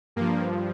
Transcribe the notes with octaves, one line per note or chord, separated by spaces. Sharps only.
G2 F3 A#3